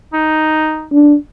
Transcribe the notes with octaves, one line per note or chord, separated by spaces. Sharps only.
D#4
D4